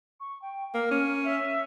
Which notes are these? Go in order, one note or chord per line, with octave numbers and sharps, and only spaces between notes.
C#6
G5
A#3 F6
C#4
E5